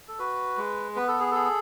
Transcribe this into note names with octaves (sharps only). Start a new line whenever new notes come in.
A4
F#4 B4
G#3
B3 B4
A4
G#4
G#4 A4